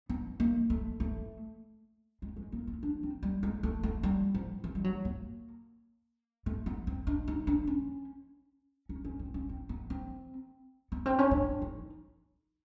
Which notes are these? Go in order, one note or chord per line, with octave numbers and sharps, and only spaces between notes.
B3
A#3
A3
A3
G#3
G#3
A#3
B3
D4
C4
G3
G#3
A3
A3
G3
F3
E3
G3
F#3
A#3
A3
B3
C4
D4
D#4
D4
C#4
C#4
C#4
C4
C#4
C4
B3
C4
B3
C4
C#4
D4
D#4